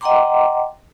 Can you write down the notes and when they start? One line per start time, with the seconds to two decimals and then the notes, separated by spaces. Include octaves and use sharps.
0.01 D#5 F#5 G5 A#5 C6 D6